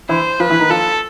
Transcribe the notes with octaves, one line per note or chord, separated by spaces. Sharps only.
E3 E4 C5
F3 F4 B4
E3 E4
D#3 D#4
F3 F4 A4